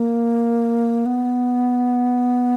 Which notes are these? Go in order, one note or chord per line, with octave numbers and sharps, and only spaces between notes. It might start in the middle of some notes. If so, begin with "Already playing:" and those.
Already playing: A#3
B3